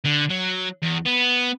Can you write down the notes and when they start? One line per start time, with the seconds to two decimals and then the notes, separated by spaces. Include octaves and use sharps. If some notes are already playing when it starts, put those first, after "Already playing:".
0.05 D3
0.30 F#3
0.83 E2
1.06 B3